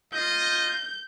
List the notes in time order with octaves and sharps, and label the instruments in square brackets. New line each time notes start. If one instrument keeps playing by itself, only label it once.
[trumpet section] F4 D#5 [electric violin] G6